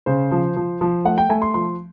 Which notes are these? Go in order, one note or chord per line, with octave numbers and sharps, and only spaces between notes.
C#3 C5
F3
F3
F3
A3 F#5
G5
A3 G#5
C6
F3 C6